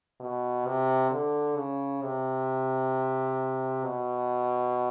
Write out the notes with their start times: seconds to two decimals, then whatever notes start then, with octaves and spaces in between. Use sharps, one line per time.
0.20 B2
0.66 C3
1.11 D3
1.56 C#3
2.02 C3
3.84 B2